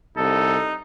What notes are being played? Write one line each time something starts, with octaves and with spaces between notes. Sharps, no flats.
C2 D#4 A4